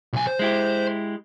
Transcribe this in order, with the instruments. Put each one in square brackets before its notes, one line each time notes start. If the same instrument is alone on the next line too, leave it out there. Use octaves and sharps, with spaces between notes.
[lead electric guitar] B1 G#5
C5
[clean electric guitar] G#3 E4 G4